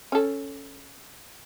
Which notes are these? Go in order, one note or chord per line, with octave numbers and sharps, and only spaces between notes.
C#4 A4